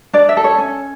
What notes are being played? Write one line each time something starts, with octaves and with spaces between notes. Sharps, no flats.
D4 D5
E5
A4
C#5
C#4